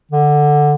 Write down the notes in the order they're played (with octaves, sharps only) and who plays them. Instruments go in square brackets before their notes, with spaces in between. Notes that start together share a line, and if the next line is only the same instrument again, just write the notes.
[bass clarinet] D3